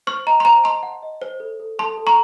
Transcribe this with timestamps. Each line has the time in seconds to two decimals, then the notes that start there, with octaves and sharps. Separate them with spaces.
0.07 C5 C#6 F6
0.27 D#5 A#5
0.40 C6
0.45 C5 A#5
0.64 D#5 A5 C6
0.83 F#5
1.03 D#5
1.22 C5
1.40 A4
1.60 A4
1.79 A4 A5 C6
1.98 A4
2.07 A#5 C#6